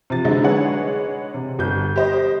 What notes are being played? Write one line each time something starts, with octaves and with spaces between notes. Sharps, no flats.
C3 F3 A6
D3 F#3 G#3 D#4 E4
G#3 D4 G#4 B4 C#5 F#5
C3
G1 G6
G4 C5 D#5